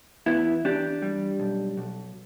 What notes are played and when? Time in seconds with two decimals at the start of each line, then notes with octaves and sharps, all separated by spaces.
0.26 E2 B3 E4
0.65 E2 D4 G4
1.02 G3
1.40 B1
1.77 B1